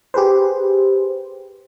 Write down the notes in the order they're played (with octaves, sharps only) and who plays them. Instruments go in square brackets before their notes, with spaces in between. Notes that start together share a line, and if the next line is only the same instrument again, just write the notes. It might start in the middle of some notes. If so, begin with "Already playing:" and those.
[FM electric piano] G4 G#4 B4 C5